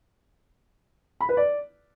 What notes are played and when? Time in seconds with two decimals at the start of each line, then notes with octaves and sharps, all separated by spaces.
1.21 B5
1.29 B4
1.37 D5